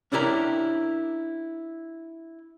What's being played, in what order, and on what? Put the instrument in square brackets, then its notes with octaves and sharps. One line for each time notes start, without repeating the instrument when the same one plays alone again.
[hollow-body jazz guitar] C#4 D4 E4 G4 A#4